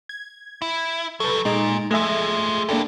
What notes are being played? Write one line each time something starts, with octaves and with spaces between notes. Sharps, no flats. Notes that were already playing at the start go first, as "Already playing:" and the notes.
G#6
E4
F#3 G3 A4 B4
A#2 G#3 D#4 D7
F3 G#3 A3 G#4 E5
A#3 D4 E4 G4 A4